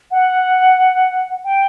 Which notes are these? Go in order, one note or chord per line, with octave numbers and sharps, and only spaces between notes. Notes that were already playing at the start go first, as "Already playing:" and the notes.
F#5
G5